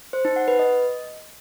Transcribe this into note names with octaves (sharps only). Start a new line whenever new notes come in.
C5
D#4
F#5
B4
D#5